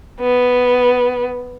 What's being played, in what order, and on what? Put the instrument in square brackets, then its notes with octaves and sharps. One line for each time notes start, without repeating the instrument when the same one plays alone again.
[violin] B3